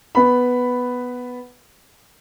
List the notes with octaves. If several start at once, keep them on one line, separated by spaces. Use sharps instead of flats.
B3 B5